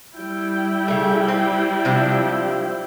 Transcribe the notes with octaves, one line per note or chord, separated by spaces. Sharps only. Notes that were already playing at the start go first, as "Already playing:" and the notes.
G3 E4 G5
C#3 A3
C4
C3 F3 D4